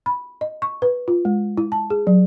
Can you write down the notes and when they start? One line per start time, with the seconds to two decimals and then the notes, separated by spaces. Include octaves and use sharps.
0.06 B5
0.41 D#5
0.62 C#6
0.82 B4
1.08 F4
1.25 G#3
1.57 E4
1.72 A5
1.90 G#4
2.07 F#3